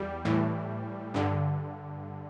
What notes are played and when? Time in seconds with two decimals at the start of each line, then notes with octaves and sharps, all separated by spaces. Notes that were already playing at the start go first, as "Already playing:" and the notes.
Already playing: E2 G3
0.25 A2 E3
1.14 G2 D3